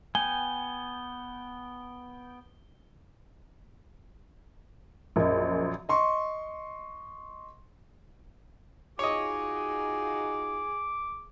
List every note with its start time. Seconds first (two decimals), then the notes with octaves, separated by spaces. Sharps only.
0.15 B3 G5 G#5 G7
5.16 A#1 F#2 A#4 D#5
5.89 D#5 C6 C#6
8.99 D#4 F4 F#4 G#4 C#5 D#5 D6